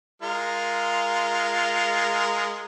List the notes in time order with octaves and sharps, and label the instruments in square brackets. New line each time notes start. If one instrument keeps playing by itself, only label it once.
[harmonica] G#3 F4 A#4